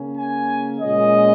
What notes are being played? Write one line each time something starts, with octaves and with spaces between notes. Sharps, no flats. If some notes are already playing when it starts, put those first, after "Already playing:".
Already playing: C#3 A#3 C#4
G#5
A#2 G#3 C#4 D#5